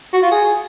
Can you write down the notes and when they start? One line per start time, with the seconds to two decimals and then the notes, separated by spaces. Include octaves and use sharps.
0.13 F#4
0.22 F4
0.32 G#4